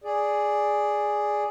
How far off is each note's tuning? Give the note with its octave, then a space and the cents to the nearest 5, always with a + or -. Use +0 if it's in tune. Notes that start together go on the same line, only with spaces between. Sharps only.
G#4 +0 D5 +0